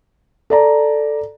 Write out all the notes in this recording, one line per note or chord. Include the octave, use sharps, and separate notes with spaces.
A4 D5 A#5